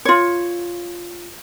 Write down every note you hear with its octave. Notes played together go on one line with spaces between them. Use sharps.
F4 C#5